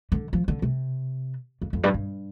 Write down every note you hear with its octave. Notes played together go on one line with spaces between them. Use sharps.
D3
F3
D3
C3
F2
F2
G2
G2